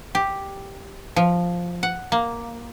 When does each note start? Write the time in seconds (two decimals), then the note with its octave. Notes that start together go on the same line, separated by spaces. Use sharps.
0.15 G4
1.16 F3
1.83 F#5
2.12 A#3